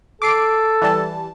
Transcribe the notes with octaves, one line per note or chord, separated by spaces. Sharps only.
A4 D6 C7 D7
E3 G3 A5